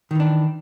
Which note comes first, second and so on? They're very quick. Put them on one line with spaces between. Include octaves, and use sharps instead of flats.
D#3 E3 D4